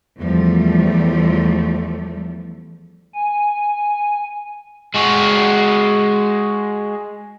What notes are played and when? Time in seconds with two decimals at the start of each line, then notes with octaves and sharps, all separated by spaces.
0.19 E2 F3 G3 A3
3.14 G#5
4.95 G#3 F#4